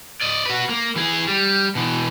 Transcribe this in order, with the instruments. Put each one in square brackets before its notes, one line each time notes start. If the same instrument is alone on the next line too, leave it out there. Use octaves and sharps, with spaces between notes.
[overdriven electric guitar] D5 D#5
F#4 B4
A#3
E3 G#4
G3
B2 E3